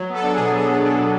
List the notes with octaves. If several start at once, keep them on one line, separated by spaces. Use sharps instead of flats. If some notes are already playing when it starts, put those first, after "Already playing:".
Already playing: F#3
B3 A4
D4
G#4
B2
F#3 G#4
B3
D4
B2